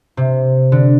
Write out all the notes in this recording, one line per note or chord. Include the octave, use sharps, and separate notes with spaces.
C3
D3